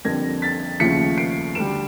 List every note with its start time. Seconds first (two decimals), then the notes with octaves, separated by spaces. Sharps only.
0.05 F2 D3 G3 A#3 G#6 A#6
0.42 A6 B6
0.80 D#2 C#3 F3 A3 B6 C#7
1.18 C7 D7
1.55 D2 D3 G3 D7 E7